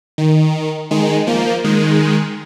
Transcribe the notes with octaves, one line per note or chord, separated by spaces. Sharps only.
D#3
D#3 G#3
F3 A#3
D#3 G#3